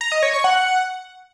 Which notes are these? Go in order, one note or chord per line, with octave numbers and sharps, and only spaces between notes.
A#5
D#5
C#5
C#6
F#5